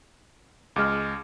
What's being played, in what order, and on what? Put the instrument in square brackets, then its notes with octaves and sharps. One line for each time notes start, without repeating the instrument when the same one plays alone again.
[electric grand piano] C#2 G#3 [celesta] D6 F6